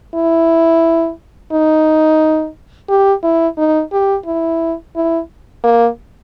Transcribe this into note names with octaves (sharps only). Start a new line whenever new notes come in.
E4
D#4
G4
E4
D#4
G4
E4
E4
A#3